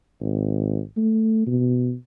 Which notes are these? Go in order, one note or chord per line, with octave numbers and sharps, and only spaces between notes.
G#1
A3
B2